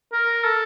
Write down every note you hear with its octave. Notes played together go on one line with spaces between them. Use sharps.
A#4
A4